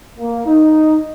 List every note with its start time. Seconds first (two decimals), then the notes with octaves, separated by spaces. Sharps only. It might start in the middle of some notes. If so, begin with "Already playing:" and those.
0.18 A#3
0.46 D#4